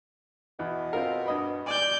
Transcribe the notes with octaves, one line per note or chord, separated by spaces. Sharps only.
E2 B2
C4 F4 A#4
G2 D#5 B5
D5 G#5 G6